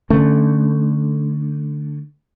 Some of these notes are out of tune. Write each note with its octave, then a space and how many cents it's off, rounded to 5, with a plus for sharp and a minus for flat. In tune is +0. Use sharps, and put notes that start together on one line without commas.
D3 +10 A3 +0 C#4 +0